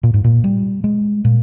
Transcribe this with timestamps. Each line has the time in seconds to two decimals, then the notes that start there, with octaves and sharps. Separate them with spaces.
0.03 A#2
0.14 G#2
0.24 A#2
0.44 G3
0.84 G#3
1.25 A#2